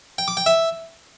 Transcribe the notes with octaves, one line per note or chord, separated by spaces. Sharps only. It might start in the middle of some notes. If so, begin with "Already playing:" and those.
G5
D6
G5
E5